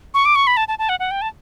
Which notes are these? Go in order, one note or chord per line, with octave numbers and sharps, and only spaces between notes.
C#6
D6
C#6
B5
A5
A5
A5
F#5
F#5
G5
A5